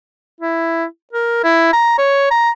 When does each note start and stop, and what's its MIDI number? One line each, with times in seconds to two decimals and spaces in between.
0.41 0.85 64
1.13 1.41 70
1.44 1.70 64
1.73 1.98 82
1.98 2.31 73
2.31 2.50 82